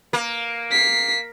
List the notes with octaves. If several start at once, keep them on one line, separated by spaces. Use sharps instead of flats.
A#3
B6 C7